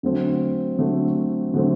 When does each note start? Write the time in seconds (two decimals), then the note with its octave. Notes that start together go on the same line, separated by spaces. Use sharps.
0.03 D3 F#3 A3 C4
0.78 D3 F#3 A3 C4
1.54 D3 F#3 A3 C4